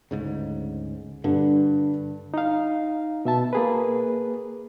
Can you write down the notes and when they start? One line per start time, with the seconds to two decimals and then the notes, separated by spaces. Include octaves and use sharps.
0.11 D2 G#2 C#3
1.24 G2 D3
2.34 D#4 F5
3.25 B2 E5 A5
3.53 A#3 G#4 B4